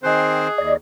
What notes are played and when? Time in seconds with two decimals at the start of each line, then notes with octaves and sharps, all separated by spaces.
0.03 D#3 C4 G#4 C5 D#5 G#5 F#6
0.58 D#2 D5 D#5